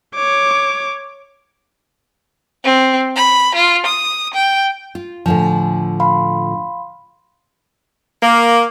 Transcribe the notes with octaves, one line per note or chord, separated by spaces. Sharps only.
C#5 D6
C4
B5
F4
D#6
G5
F4
A2 D3 F3 G#5
F5 B5 C6
A#3